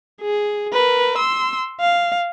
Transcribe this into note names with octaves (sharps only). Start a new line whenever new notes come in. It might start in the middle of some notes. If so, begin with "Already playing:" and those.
G#4
A#4 B4
C6 E6
F5